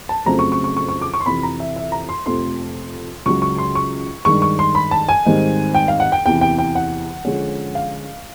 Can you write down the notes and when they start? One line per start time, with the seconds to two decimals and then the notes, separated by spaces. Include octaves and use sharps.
0.09 A5
0.26 F2 C#3 F#3 A3 C4 A#5
0.39 C#6
0.52 C#6
0.64 C#6
0.77 C#6
0.89 C#6
1.01 D6
1.14 C#6
1.20 C6
1.26 F2 C3 E3 B5
1.43 A#5
1.60 E5
1.76 E5
1.92 A#5
2.09 C6
2.26 F2 C3 F3 A3 C6
3.26 C#2 C#3 F#3 C#6
3.42 C#6
3.58 C6
3.75 C#6
4.25 G2 D#3 G#3 C#6
4.42 C#6
4.59 C6
4.75 B5
4.91 A5
5.08 G#5
5.25 G#2 D#3 G3 C4 D#4
5.74 G5
5.88 F5
6.00 F#5
6.12 G5
6.26 E2 C3 E3 G5
6.41 G5
6.58 G5
6.75 F#5
7.25 D3 F3 G#3 C#4
7.75 F5